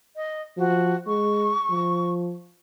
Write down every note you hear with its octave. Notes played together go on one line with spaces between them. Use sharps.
D#5
F3 F#4
G#3 C#6
F3